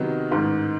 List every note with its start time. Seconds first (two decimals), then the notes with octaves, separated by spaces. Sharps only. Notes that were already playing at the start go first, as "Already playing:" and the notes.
Already playing: C3 D#3 F#3 B3 D#4
0.31 A1 G#2 D#3